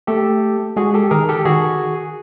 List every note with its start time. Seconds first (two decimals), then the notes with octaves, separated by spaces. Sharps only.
0.07 A3 G4 A4
0.76 G#3 F#4 G#4
0.94 G4 A4
1.11 D#3 G#4 A#4
1.29 G4 A4
1.45 D#3 F#4 G#4